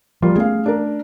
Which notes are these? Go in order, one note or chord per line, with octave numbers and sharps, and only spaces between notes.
F3 G3 A#3 F4
A3 B3 C#4 G#4 F5
D4 A#4